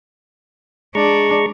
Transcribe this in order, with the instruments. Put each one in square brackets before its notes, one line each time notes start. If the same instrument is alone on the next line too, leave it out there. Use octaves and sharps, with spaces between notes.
[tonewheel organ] G#3 A#5 C#6 [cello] D4